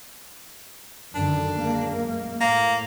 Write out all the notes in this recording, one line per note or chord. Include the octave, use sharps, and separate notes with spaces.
F#2 D3 D#3 D4
F#2 G#3 A#3
A2 A#3